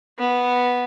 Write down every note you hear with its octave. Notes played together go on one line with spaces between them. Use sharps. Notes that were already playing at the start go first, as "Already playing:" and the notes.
B3